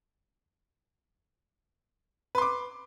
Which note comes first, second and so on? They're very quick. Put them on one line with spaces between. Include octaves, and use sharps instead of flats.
B4 C6 D6